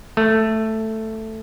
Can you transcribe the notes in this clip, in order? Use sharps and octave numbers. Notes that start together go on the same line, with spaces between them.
A3